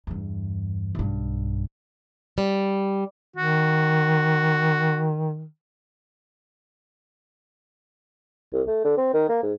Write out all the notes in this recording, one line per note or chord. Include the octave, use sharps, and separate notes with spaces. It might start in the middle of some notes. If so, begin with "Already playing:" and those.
E2 G2
B1 G2
G3
D#3 F#4
C2
A3
D3
C4
D#3
A#3
G#2